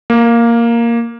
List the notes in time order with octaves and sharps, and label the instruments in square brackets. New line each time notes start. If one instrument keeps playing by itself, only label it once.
[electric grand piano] A#3